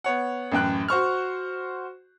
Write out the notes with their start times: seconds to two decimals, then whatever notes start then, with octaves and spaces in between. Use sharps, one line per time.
0.04 B3 C#5 F#5
0.52 A1 F#2 G5 F#6
0.88 F#4 C5 C#6 F6